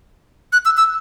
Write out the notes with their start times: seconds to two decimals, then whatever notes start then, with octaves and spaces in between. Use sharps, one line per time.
0.53 F#6
0.65 E6
0.77 E6